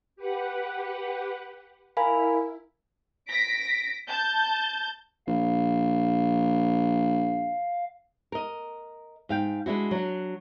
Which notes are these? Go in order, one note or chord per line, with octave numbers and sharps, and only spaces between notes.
G4 B4 F#5
E4 A#4 F5 G#5 B5
A#6 B6 D7
A5 G6
A#1 F5
A#4 D#5
G#2 F5 G5
G#3 D4 E4 F#4
F#3 D4